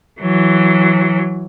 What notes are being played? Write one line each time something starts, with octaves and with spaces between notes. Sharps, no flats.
E3 F#3